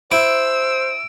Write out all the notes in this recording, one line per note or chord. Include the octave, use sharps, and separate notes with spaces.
E4 C5 E6 D7